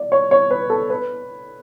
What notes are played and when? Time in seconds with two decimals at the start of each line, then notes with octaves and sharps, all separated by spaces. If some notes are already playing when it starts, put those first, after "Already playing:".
Already playing: D5
0.12 C#5
0.31 C#5
0.51 B4
0.70 A4
0.90 B4